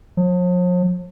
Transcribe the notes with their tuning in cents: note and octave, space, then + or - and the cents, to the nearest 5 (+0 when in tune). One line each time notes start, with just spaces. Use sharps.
F3 +45